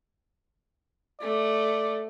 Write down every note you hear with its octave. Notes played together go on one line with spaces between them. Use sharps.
A3 D5